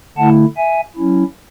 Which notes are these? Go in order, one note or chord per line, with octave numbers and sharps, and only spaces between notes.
D3 A3 E4 F#5 A5
E5 G#5
F#3 C#4 E4